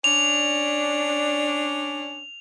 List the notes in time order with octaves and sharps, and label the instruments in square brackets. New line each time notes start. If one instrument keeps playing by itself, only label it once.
[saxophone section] C#4 D4 [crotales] F7